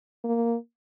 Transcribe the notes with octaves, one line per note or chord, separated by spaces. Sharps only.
A#3